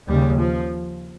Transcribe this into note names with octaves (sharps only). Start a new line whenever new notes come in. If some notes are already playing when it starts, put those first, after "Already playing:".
D#2 C#3 G3
F3